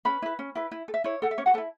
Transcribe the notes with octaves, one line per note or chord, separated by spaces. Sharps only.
C#4 B4 B5
E4 B4
C#4
E4 B4
E4
A4
E5
E4 C#5
A4 F#5
E5
C#4 C#5
F#4 F#5
A4 B4 A5
E4